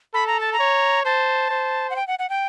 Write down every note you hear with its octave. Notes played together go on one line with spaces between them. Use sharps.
A4 B5
A#5
A5
A#5
C#5
C5 A5
C5
F#5
G5
F#5
F#5
G5